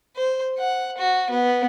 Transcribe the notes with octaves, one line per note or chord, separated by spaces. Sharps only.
C5
F#5
F#4
B3